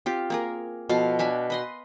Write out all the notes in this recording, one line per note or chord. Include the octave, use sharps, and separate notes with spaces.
C4 F4 G4
A#3 G#4 A#4
B2 F3 A4 F5
D4 E5 F5 G#5
B4 D#5 C6